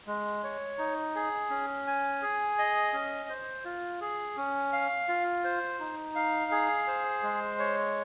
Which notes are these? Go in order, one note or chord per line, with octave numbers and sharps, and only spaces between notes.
G#3
C#5
D#4
G#4
C#4
G#5
G#4
D#5
C#4
C5
F4
G#4
C#4
F5
F4
C5
D#4
F5
G#4
C5
G#3
C#5